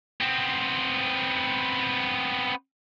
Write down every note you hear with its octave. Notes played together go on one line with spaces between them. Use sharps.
B3 C4